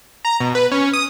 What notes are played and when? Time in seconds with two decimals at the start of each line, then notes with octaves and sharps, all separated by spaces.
0.25 A#5
0.40 B2
0.55 B4
0.72 C#4
0.93 D#6